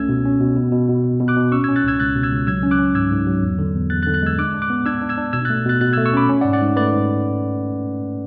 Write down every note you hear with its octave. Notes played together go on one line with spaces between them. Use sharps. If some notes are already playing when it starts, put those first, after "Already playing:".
Already playing: C#2 A3 C#4 E6 G#6
B2
C#4
B2
B2
B2
B2
B2
B2
D6 F#6
B2
C#4 C#6 E6
C#4 E6 G#6
F#6 A6
C#2 E6 G#6
C#2 F#6 A6
B2
E6 G#6
C#2
F#3 E6 G#6
C#4
D6 F#6
C#4
G#2 E6 G#6
G#2
F#3
E2
D3
E2
E2 F#6 A6
F#6 A6
D3
F#6 A6
G#3 E6 G#6
D4 D6 F#6
D4
D6 F#6
B3
D4 E6 G#6
D4
E6 G#6
D4
B2 E6 G#6
A3 F#6 A6
B2 F#6 A6
B2 F#6 A6
A3 E6 G#6
C#6 E6
C#4 B5 D6
C#4
D5 F#5
G#2
D5 F#5
G#2
A3 B4 D5
G#2